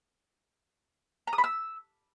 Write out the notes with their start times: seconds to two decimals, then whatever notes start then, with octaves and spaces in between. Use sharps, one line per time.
1.27 A#5
1.33 D#6
1.38 B5
1.44 E6